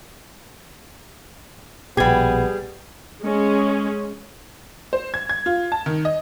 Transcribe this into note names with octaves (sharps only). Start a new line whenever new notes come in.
A#1 B2 G3 B3 G4 G#4 G#6
G#3 C#4 G#4
C5
G#6
G#6
F4
A5
D#3
D#5